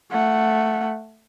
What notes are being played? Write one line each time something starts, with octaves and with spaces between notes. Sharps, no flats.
A3 F#5